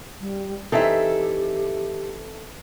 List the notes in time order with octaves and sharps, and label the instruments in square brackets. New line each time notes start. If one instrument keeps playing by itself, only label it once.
[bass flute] G3
[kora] E3 C4 D#4 [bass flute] G4 [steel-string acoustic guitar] A4 E5